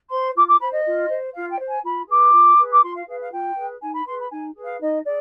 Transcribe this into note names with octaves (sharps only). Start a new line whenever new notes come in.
C5 C6
F4 D6
D6
C5 B5
D#5
F4
C5
F4 F5
G5
C5
G#5
F4 B5
G#4 B4 D6
F4
G#4 B4
D6
F4 C6
F5
G#4 B4 F5
F5
F4 G5
G#4 B4
D#4 G#5
B5
G#4 B4 C6
B5
D#4 G#5
G#4 B4
F5
D#4 D#5
G#4 D5